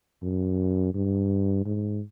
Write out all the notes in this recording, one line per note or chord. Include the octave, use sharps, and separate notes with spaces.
F#2
G2
G#2